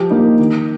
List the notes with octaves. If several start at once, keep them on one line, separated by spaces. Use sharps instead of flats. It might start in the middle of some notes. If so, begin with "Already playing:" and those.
Already playing: F3 G4
A#3 D#4
D#3